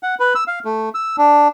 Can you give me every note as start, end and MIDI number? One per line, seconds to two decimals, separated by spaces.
0.03 0.15 78
0.20 0.34 71
0.35 0.44 88
0.48 0.59 77
0.65 0.89 57
0.95 1.16 88
1.18 1.48 62